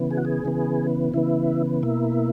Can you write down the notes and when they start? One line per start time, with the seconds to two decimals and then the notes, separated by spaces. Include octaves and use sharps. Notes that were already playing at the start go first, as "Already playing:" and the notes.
Already playing: C#3 E3 B3
0.11 G#4
0.17 F#4
0.25 G#4
0.45 C#3 E3 B3
1.14 C#3 E3 B3 E4
1.83 B2 A#3 E4